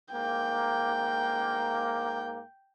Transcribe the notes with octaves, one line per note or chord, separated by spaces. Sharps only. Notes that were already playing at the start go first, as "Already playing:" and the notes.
G#2 A#3 G5